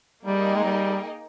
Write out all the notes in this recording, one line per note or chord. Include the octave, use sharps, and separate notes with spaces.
G3 A#3 D#4 G#4 D#5 G5
G#3
G3